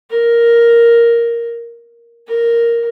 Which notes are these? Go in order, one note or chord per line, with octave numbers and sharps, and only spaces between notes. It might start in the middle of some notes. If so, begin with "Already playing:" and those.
A#4
A#4